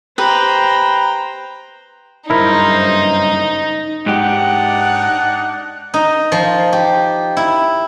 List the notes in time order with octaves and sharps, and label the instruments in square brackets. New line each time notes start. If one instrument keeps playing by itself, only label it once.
[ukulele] G4 [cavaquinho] B4 [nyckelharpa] C5 G5 [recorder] A#5
[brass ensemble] F#1 G2 C5 [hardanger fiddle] D#4 [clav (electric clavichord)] E4 A#4
[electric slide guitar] G#2 G4 [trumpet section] D4 D#4 F#5
[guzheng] D#4
F3
G4
E4